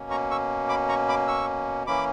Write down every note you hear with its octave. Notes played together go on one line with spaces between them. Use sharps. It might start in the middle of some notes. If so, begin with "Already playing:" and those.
Already playing: B2 A#3 C#4
A#5 C#6
C#6 E6
B5 D6
A#5 C#6
B5 D6
C#6 E6
E3 A#3 C#4 B5 D6